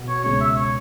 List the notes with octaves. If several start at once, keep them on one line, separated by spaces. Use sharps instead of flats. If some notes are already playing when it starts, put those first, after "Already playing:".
Already playing: B2 B3 F#4
C#5
C#2 B2 G#3 C#4 C#5
E5
C#5